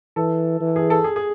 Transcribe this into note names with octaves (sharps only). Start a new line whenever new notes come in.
E3 A4
E3
G#4
A4
G#4
G#4